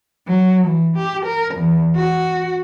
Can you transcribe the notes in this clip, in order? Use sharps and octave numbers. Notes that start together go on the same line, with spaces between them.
F#3
E3
G4
A#4
E2
F#4